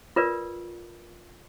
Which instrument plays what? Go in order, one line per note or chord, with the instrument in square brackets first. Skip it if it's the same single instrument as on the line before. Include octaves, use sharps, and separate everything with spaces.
[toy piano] F4 A#4 B4 D5